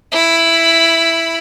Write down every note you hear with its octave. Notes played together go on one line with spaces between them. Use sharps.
E4 B5